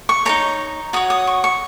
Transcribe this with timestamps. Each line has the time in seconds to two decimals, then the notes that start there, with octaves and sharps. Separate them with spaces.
0.09 C#6
0.25 D#4 A#4 C#5 A#5
0.93 F#4 C#5 D#6
1.10 D#6
1.27 C#6
1.44 C#6